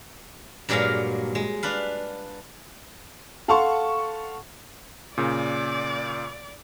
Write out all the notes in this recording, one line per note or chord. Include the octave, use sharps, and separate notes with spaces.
G2 A#2 F#3 G#3 A#4 F5
G#3
D4 B4 F5
A4 F5 F#5 A5 C6 C#6
A#2 C#3 D5